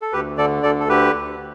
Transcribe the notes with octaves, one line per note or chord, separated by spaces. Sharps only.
A4
D2 G4 B4
D3 A4 D5
D2 A4 D5
A4
D3 G4 B4
D2